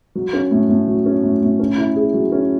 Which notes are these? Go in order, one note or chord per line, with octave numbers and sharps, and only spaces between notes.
F#3
C#4
A2
A2
F#3
C#4
A2
A2
C#4
E4
G#4
F#3
C#4